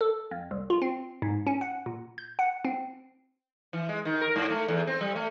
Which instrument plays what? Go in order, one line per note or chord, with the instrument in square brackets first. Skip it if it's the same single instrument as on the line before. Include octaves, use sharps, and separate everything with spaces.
[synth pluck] A4
F2
C2
F4
C4
G#2
C#4
F#5
A#2
G6
F#5
C4
[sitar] E3
G#3
D#3
A#4
G#2
A3
E2
C4
G3
A3